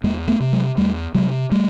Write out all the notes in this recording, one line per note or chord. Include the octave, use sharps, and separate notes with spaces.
E2 G#3 A#3
A3 B3
C3
F#3 G#3
E2 G3 A3
C3 F#3 G#3
G3 A3